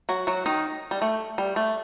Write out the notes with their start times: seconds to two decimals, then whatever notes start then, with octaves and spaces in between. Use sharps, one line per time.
0.09 F#3 F#4
0.27 F#3 F#4
0.46 D#3 D#4
0.91 G3
1.02 A3
1.38 G3
1.56 A3